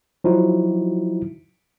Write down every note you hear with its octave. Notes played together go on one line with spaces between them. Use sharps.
F3 F#3 D#4 E4 F#4